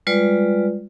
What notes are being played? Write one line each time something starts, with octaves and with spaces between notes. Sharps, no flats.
G3 G#3 F4 B4 D5